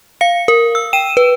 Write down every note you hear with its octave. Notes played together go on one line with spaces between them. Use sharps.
F5 C#7
A#4
E6
G5 D#7 E7
B4